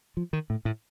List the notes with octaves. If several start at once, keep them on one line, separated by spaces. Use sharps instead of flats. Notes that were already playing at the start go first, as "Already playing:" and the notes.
F3
D#3
A2
A2